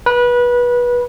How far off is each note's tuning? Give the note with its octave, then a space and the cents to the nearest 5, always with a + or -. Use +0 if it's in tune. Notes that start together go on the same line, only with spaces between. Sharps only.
B4 -25